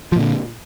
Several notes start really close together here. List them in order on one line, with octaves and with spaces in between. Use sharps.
F3 A#2 D3